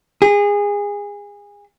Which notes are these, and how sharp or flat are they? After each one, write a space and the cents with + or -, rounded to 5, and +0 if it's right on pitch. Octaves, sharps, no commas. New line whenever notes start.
G#4 -25